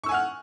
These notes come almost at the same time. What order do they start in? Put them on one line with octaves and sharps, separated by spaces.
C#6 E6 G#5 F#5 F6